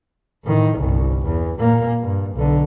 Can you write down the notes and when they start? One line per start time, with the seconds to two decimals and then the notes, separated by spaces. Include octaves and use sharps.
0.44 A2 D#3
0.79 G1 C2
1.26 E2
1.58 A#2 A#3
2.01 G2
2.35 B1 D3